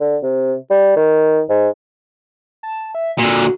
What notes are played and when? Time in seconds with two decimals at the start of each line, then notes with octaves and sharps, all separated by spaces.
0.01 D3
0.23 C3
0.70 G3
0.96 D#3
1.50 G#2
2.63 A5
2.95 E5
3.19 A#2 D3 F#4